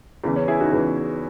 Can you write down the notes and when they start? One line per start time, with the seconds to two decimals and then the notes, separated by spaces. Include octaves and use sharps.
0.24 E2 C#3 E3
0.36 C#4
0.48 E4 G#4
0.60 D#4 F#4
0.73 E2 C#3 E3